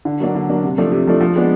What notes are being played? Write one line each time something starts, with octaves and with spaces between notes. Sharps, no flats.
D3
F#3 A#3 D4
D3
F#3 A#3 D4
C3
F3 A3 D4
C3
F3 A3 D4
F3
G#3 B3 D4